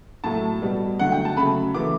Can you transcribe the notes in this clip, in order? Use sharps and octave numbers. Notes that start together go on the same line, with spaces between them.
A2 F#3 A3 A5
B2 G3
D3 F#3 A3 F#5
G5
A5
C#3 F#3 A3 B5
C#3 E3 A3 D6